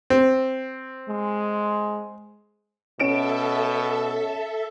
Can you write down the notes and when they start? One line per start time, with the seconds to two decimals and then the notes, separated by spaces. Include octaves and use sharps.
0.10 C4
1.08 G#3
3.00 B2 C#4 A4 E5 D7 E7